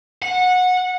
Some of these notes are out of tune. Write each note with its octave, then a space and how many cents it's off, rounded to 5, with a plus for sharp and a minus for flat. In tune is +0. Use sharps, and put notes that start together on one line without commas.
F#5 -20